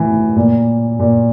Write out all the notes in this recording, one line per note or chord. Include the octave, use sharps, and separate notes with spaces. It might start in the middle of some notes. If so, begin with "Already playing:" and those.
Already playing: A2 E3
A#2
A#2